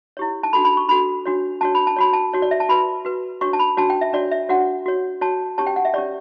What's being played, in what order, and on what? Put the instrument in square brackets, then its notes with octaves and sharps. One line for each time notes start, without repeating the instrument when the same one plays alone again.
[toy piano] E4 G4 C#5
A5
D4 F#4 A4 B5
B5
C#6
D4 F#4 A4 B5
D4 F#4 C#5
D4 F#4 C#5 A5
B5
A5
F#4 C#5 B5
A5
F#4 C#5
D5
E5
A5
F#4 B4 B5
F#4 B4
D4 F#4 C#5 C#6
A5
B5
D4 F#4 C#5 A5
G5
E5
D4 F#4 C#5 D5
E5
D4 F#4 C#5 F#5
F#4 C#5
F#4 C#5 A5
C#4 G4 C#5 A5
G5
F#5
E5
C#4 G4 C#5 D5